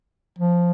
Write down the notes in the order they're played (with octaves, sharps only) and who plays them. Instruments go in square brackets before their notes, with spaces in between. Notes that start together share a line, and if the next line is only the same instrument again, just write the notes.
[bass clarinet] F3